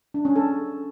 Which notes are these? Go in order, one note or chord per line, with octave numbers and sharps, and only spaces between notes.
D4
C#4
A4